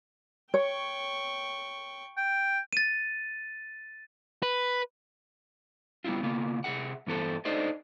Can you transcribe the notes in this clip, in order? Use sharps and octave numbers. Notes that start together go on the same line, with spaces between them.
C#5 G5 C#6
G5
A6 D#7
B4
G3 B3 C4 E4 F4
C#3 A#3 B3 F4
C3 G#3 G#4 E5 F#5
G2 E3 B3 A4 C5
D4 D#4 A4 C5 D5 D#5